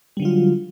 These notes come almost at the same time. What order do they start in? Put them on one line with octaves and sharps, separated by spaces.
G3 D3 F#3 F4